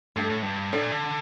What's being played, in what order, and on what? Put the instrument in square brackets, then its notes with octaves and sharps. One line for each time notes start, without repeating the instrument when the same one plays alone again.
[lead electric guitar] G2 [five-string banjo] A3 D4 A4
[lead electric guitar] A2
G2
[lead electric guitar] A2 [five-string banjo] D4 A4 D5
[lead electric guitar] A#2
D3